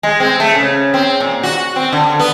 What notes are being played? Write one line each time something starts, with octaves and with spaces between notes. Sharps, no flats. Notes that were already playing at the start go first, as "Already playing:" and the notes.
G#3
C4
A3
C#3
C4
A#2
F#4
C4
D3
B3